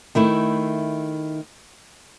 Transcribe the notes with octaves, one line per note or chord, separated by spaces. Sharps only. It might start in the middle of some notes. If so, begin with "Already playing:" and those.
D#3 A3 E4